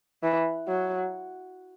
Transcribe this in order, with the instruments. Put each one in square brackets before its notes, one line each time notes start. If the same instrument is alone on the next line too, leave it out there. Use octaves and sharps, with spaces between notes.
[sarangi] E3
F#3